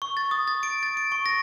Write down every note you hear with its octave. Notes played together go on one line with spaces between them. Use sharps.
C#6
A6
D#6
A6
D7
A6
D7
C#6
A#6